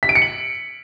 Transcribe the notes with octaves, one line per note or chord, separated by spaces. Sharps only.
B6
D7
C#7
F#7